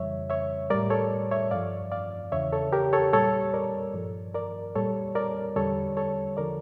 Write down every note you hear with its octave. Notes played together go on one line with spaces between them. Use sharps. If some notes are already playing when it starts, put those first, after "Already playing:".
Already playing: F2 C#3 E3 G3 C#5 E5
C#5 E5
A2 G3 A#4 D5
A4 C#5
C#5 E5
G2 F3 D5 F5
D5 F5
E2 C#3 E3 C#5 E5
A4 C#5
G4 A#4
A4 C#5
A#2 G3 A4 C#5
A#4 D5
G2 F3
A#4 D5
A#2 G3 A4 C#5
A#4 D5
E2 D3 G3 A4 C#5
A4 C#5
D3 F3 A#4 D5